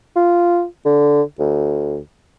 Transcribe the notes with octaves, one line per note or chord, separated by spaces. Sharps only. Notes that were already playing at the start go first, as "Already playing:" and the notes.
F4
D3
D2